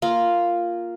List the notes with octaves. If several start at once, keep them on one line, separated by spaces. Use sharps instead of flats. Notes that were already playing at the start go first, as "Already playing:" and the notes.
A#3 F4